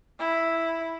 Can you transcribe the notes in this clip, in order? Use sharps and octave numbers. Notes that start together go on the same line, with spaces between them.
E4